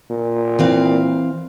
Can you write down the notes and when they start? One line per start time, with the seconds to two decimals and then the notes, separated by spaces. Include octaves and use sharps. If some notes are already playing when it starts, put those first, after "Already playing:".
0.10 A#2
0.59 E3 C4 F5